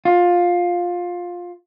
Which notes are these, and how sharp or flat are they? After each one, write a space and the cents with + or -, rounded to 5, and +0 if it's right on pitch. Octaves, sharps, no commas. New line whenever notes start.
F4 +15